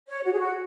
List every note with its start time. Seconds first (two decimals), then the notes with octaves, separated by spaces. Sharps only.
0.08 C#5
0.25 F#4
0.32 G#4
0.39 F#4